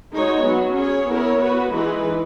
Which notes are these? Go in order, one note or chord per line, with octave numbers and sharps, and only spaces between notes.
G#3 D#4 F#4 C#5
F#3 B3 F#4
C#4 G#4 C#5
B3 E4 A#4 C#5
B3 F#4 B4
E3 G#3 D#4 G#4 B4